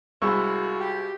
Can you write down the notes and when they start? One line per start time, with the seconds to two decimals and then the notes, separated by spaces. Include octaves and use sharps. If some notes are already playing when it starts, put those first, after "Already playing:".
0.22 C2 G#3 F4 F#4 B5 C#6 E6
0.79 G4